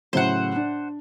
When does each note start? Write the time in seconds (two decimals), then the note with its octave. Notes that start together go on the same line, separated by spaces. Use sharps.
0.13 A2 C#3 F#3 C5 F#5
0.56 D4